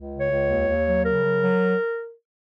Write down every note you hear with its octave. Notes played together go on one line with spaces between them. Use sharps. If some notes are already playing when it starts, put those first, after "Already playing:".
Already playing: C#2
C#3
C#5
C#2
D#2
D#2
F#3
C#3 A#4
F#3
F#3